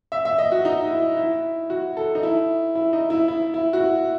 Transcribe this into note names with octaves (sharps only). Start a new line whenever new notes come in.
E5
E5
D#5
F#4
D#4
E4
E4
F#4
A4
D#4
E4
E4
D#4
E4
E4
E4
F#4
E4